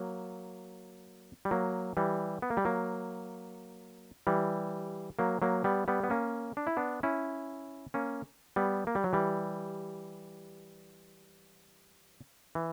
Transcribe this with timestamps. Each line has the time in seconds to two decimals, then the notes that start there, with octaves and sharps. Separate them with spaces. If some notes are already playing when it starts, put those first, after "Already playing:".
Already playing: F#3 A#3
1.45 G3
1.51 F#3 A#3
1.97 E3 G3
2.42 B3
2.50 A#3
2.57 G3
2.65 F#3 A#3
4.27 E3 G3
5.19 F#3 A#3
5.42 F#3 A#3
5.64 G3 B3
5.88 G3 B3
6.04 B3
6.10 A#3 C#4
6.57 D4
6.67 E4
6.77 B3 D4
7.03 C#4 E4
7.94 A#3 C#4
8.56 G3 B3
8.87 A#3
8.95 G3
9.04 F#3
9.13 E3 G3
12.55 E3